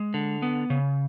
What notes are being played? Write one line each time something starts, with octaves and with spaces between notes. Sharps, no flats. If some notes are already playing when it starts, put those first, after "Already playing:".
Already playing: G#3
D3
B3
C#3